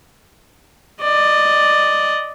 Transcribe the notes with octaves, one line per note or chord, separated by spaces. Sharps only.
D5 D#5